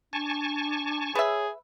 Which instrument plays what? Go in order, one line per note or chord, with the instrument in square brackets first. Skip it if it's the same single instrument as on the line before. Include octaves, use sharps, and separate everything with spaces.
[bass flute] D4 [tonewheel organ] G#5 A5 C#6
[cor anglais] G#4 [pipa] B4 E5 [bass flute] C#5